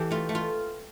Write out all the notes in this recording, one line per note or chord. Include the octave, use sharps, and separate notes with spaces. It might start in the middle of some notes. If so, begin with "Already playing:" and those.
Already playing: E3 G4 A4
A3 F4
A3
F4